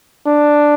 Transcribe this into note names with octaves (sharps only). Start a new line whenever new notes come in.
D4